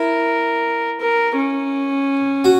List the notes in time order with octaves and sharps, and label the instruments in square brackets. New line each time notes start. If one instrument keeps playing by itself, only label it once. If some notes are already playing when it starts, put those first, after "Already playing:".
Already playing: [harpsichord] E4 [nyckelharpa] A#4
[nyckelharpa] A#4
C#4
[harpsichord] F#4